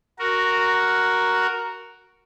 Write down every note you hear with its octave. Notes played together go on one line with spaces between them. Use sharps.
F#4 A#4